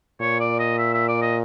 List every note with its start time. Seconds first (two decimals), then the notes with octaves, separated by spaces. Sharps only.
0.21 A#2 C#5
0.40 D5
0.60 D#5
0.78 E5
0.94 E5
1.09 D5
1.22 D#5